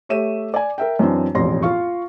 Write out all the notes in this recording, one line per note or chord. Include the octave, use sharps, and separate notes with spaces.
A3 G4 C#5 E5 D#7 E7
D5 G#5
A#4 E5 G5
F#2 E3 C4 D4
E1 A1 F2 D5 C6 A#6
F4 F5 C#6